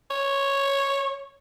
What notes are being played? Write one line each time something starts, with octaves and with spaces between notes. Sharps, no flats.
C#5